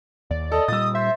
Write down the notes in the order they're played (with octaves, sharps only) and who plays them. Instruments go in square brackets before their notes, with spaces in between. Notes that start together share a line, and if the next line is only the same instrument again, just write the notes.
[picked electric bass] D#2 [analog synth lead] D5
[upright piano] A4 [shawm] D#5
[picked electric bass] A#2 G3 [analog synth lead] D#6 [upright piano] E6 A6
[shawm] C5 [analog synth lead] E5